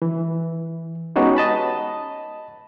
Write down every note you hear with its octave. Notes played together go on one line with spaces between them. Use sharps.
E3
G#3 B3 C#4 D#4 F#4 G4
D#5 A5 B5